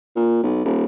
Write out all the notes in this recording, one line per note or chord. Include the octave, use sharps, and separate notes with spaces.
A#2
B1
D#1